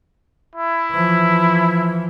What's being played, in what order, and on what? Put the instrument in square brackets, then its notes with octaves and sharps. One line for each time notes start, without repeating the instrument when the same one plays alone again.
[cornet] E4
[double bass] E3 F3